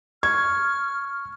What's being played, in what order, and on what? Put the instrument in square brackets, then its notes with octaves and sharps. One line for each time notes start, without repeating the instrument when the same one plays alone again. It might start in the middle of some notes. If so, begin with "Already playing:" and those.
[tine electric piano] C#6 [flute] F6 [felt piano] G#6